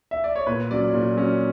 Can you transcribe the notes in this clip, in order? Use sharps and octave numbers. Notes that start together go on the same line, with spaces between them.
E5
D5
C#5
A#2 B4
F#3 C#4 D5
A#2
F#3 C#4